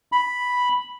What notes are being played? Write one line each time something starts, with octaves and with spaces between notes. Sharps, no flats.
B5